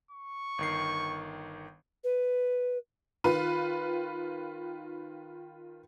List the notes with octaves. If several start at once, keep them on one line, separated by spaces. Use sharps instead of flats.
C#6
G1 D#3 C7
B4
D#3 F4 B4